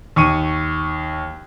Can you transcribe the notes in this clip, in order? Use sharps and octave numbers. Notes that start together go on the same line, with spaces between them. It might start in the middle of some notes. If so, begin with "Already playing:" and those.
D#2 C#6 D#7